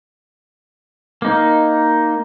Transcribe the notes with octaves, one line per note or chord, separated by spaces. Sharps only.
A#3 D#4